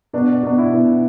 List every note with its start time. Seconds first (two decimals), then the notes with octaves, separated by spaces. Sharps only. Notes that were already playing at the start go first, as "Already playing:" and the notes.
0.13 B2 D4
0.43 B2 D4
0.58 E4
0.73 B2